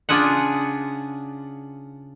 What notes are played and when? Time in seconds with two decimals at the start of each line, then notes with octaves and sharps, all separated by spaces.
0.09 C#3 D4 F4 G#4 F#5